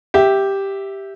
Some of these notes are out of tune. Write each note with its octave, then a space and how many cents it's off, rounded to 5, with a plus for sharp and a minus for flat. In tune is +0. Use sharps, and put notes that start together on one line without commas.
G4 +0 E5 +0